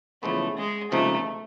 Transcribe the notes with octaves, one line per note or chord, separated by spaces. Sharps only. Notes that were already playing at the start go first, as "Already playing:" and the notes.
E2 C#3 F3 G#3 A3 B3
G#3
C#2 C3 F3 A3 A#3 D#4